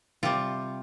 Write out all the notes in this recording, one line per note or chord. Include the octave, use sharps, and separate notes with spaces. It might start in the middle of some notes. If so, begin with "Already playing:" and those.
C3 G3 F4